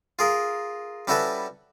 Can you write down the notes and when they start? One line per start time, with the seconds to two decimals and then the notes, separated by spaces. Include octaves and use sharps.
0.19 F4 G#4 A#4
1.07 G3 C#4 E4 F#4 A4 B4